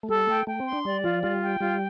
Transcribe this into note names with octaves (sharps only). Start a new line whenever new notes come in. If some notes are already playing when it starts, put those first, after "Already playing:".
A3
G3 A4
A3 G5
A3 G5
C4
C6
D4
G3 D5
F3 F4
G3 F4
G5
G3 F4